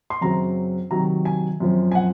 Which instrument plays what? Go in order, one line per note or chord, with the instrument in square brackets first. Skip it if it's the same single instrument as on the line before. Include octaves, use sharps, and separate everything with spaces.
[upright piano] C6
F#2 C#3 F#3 C4 A#5
C3 D#3 F#3 A#5
G#5
F#2 F3 C4
G#5
F#5